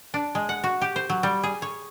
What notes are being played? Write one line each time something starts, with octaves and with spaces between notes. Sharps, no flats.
D4
G#3
F#5
F#4
G4
C5
F#3
G3
G#4
C#5